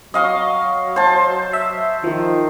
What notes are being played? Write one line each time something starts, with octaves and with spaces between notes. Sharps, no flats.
F#3 D#5 F5 C#6
C5 A5
E5
D#3 F3